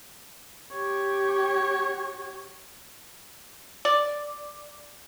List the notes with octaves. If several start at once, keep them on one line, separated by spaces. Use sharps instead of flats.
G4 C#5
D5